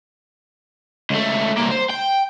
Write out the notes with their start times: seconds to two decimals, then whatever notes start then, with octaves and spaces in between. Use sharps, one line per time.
1.10 C#2 A3
1.58 C2 A#3
1.72 C5
1.90 G5